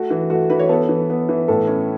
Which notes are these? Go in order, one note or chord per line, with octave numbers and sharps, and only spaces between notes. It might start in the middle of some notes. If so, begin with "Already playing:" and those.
Already playing: A3 F#4
E3
A3 F#4
E3 B4
C#5
B3 A4
E3
B3
E3
A2 A4
C#4